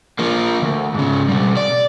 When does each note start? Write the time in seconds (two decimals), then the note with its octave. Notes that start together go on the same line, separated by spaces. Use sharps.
0.19 F3 A#3
0.62 D2
0.95 G#2 C#3
1.29 B2 G3
1.57 D5